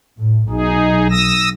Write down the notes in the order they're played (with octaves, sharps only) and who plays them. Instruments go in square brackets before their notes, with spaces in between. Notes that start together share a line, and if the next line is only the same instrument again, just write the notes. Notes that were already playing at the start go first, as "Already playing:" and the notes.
[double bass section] A2
[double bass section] B1 [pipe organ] D#4 G#4
[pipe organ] D#6 E6 A#6